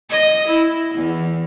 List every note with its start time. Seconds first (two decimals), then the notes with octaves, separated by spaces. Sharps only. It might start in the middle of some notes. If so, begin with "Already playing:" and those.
0.10 D#5
0.48 E4
0.95 E2